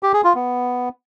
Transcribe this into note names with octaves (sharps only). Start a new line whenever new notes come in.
G4
G#4
F4
B3